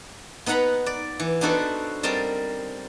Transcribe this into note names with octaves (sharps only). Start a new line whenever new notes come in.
B3 D#4 B4 F#5 A#5 B5
D5
E3
B3 D4 D#4 F#4 A4 C5
G3 C4 A#4 D#5 A5